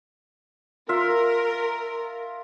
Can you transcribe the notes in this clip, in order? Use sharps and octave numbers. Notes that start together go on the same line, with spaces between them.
F4 A#4 E5